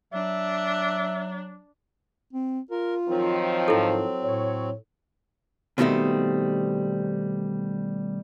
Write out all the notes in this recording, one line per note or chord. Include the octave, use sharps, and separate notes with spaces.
F#3 D4 E5
C4
F4 A#4
D#3 F3 F#3 C4
G#2 E4 A4
A2 C#5
B2 D#3 G3 A3 C4